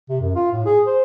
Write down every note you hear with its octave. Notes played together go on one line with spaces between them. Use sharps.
C3
F#2
F4
A2
G#4
C5